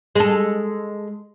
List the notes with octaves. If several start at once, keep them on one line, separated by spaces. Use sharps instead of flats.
G#3 A4